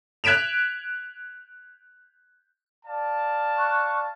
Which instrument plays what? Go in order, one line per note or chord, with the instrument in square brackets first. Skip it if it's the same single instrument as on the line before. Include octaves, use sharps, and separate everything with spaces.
[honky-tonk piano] F#6 G#6 B6 D7 E7 F7
[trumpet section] D5 F5 A5
[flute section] C#6 F#6